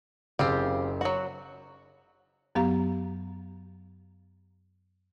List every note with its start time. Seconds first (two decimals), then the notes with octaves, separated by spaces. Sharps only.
0.39 F#1 C#3 C4 F4 G4
1.01 F#3 F#4
2.55 F#2 F#3 B3 G4 F5 A#5